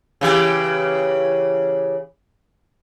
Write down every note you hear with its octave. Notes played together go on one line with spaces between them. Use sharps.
C#3 E3 G4